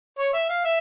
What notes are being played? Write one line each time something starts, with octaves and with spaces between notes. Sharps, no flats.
C#5
E5
F5
E5